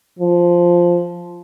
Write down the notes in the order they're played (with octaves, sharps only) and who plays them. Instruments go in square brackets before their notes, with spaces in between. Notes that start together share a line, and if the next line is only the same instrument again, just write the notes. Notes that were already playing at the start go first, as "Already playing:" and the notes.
[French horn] F3